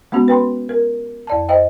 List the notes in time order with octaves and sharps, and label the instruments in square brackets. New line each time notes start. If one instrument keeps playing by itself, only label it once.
[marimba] G#3 B3 C#4 F#4
B4 G5 B5 C6
A#4
F2 D5 A5
C5 D#5 G5